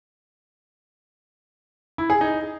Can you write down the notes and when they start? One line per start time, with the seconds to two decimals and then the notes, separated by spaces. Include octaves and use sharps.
1.98 E4
2.10 G#4
2.21 D#4